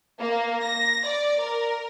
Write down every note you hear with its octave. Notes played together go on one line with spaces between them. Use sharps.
A#3
A#6
D5
A#4